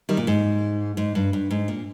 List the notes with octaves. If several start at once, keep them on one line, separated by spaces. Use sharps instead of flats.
D#3 G3
A#2
G#2
G#2
G2
G2
G#2
A#2